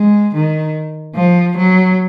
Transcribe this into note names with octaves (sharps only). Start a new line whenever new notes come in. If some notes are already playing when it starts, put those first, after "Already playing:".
Already playing: G#3
D#3
F3
F#3